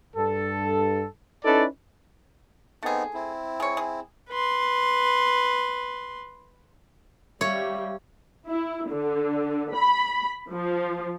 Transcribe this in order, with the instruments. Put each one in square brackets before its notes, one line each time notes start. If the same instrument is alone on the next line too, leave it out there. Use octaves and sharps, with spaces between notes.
[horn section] G2 A4
C#4 D#4 E4 A4 B4 D5
[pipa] A3 G#4 [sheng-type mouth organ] B3 C4 D#4
[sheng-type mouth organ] C4 E4
[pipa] G#4 C#5
G#4
[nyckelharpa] B4 C6
[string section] G3 [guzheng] C#5 [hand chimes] E5 F5
[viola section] E4
D3
B5
F3